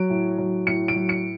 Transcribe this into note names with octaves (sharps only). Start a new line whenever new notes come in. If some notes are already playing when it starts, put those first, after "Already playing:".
Already playing: F#3 D7
A2
F#3
A2 C#7
D7
F#3
C#7